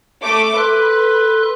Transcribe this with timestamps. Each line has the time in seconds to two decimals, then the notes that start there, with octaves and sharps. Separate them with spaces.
0.23 A3 D6
0.57 A4 B4 C6 F#6